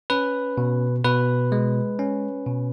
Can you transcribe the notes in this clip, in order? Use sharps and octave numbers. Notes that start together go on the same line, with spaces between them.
C#4 B4
B2
B2 B4
G#3
C#4
B2